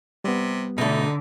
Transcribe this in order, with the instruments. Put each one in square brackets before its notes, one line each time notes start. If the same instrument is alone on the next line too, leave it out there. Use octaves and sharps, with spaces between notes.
[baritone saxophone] C3 [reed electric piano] G3 B3
[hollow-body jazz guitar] B2 A3 [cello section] D3 [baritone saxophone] D#4